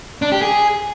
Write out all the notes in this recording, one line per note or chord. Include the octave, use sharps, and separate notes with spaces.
D4
G4
G#4